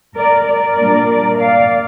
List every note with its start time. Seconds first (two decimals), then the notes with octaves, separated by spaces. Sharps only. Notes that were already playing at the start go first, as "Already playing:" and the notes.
0.16 A#4 D5
0.46 A#4 D5
0.78 A#2 G3 A#3 D4
1.38 D5 F5